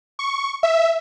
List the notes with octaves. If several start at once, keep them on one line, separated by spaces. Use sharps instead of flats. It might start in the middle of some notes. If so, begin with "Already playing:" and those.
C#6
E5